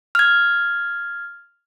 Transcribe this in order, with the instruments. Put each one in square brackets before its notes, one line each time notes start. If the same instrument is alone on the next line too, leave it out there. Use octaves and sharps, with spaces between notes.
[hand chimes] F6 G#6